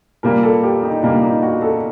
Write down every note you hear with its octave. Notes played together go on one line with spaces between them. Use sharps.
A#2 G3 A#3 A#4
A4
G4
D#4
A#2 G3 A#3 D4
D#4
F#4
A4